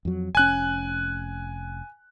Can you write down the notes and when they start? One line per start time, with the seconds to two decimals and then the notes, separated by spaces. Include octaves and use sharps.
0.05 F2 F#3
0.35 F1 C#4 G#5 F#6